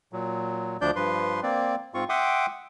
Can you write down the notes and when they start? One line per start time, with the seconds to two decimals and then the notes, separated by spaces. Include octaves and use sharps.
0.13 A#2 F#3
0.81 D2 F3 D4 D5 G6
0.96 G2 F3 B4 C6
1.43 A#3 C4 D5
1.94 G#2 C4 F4 C#6
2.09 E5 F#5 G5 C6 D6 D#6